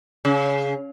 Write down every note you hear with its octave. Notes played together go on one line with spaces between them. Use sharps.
C#3